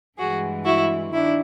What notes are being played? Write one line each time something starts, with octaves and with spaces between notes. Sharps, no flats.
G2 E3 G#3 F#4 G#4
E4 F#4
D#3 D4 E4